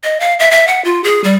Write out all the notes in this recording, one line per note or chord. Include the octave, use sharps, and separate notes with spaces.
D#5
F5
E5
E5
F#5
F4
G#4
G3